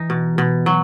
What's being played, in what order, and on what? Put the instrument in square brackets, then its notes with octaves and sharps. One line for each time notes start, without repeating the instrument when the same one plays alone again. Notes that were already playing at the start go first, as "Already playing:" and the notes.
Already playing: [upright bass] E3 [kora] D#4
[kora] B2
B2
F#3